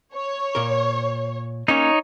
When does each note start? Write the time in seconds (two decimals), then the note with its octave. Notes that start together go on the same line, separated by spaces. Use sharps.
0.14 C#5
0.55 A#2 A#4
1.68 A#3 C#4 D#4 C#5